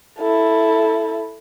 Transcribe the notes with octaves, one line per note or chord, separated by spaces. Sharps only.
E4 A4